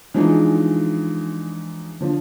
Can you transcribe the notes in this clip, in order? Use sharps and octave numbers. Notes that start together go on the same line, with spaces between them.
E3 F3 G#3 D4 D#4
D3 F3